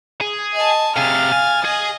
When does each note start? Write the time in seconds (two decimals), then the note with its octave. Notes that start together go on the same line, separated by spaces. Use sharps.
0.21 G#4
0.55 D#5 G#5 A5
0.96 C3 G#4 F5 F6 A6
1.32 G#5
1.65 G#4 D#5